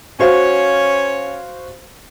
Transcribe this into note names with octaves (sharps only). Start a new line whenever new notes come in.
C#4 F#4 C5 C#5 F5